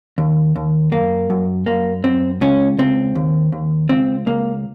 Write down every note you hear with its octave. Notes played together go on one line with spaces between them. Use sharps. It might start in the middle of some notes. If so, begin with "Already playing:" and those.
D#2
D#2
F#2 A#3
F#2
F#2 A#3
F#2 C4
C#2 C#4
C#2 C4
D#2
D#2
C#2 C4
C#2 A#3